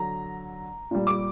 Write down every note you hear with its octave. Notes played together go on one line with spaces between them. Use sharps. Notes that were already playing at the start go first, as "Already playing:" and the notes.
Already playing: D3 F#3 A#5
A#2 G3
D6